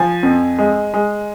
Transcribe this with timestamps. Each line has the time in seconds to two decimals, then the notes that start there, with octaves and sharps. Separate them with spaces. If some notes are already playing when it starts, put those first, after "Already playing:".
Already playing: F3 G#5
0.23 F2
0.59 G#3
0.94 G#3